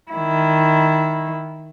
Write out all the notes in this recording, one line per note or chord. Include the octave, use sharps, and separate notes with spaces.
D#3 E4